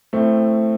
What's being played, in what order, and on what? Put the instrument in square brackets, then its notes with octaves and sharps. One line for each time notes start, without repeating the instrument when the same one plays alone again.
[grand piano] A2 A3 C4